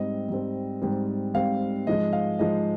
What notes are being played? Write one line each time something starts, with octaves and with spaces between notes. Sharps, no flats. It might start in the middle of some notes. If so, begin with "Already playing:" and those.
Already playing: G#2 G3 C4 D#5
G#2 G3 C4
G#2 G3 C4
G#2 G3 C4 F5
G#2 F3 G#3 D#5
F5
G#2 F3 G#3 D#5